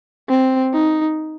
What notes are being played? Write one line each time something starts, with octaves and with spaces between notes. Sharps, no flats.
C4
D#4